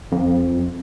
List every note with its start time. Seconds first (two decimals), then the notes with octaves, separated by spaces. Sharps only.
0.12 F2